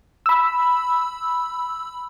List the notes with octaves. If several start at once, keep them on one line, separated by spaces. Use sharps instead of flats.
B5 E6